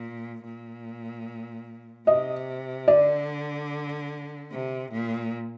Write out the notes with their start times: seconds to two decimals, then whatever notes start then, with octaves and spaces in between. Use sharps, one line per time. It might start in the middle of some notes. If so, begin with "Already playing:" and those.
Already playing: A#2
0.44 A#2
2.07 C3 D#5
2.88 D3 D5
4.51 C3
4.91 A#2